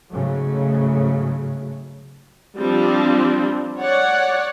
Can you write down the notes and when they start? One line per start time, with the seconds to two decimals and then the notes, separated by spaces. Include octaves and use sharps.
0.13 G#2 C#3 F#3 A3
2.59 F3 G3 C4 D4
3.80 C#5 D5 F#5